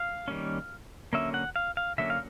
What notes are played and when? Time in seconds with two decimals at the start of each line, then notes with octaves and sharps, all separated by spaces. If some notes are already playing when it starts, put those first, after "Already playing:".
Already playing: F5
0.28 D#3 G3 A#3 C#4
1.13 D3 F#3 A#3 C#4 E5
1.34 F#5
1.56 F5
1.77 F5
1.98 D3 F#3 A#3 C#4 E5
2.10 F5